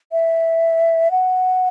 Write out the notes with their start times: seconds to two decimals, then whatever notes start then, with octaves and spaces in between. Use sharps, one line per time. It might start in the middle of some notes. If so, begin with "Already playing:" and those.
0.12 E5
1.11 F#5